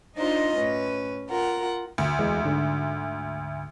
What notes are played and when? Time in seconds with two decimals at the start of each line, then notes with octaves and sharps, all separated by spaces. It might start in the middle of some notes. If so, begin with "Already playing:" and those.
0.17 D4 D#4 F4 C5 D#5
0.56 A2 C#4 B4
1.28 F4 A#4 F#5
1.98 D2
2.19 E2 E3 G#3
2.44 G#2 D3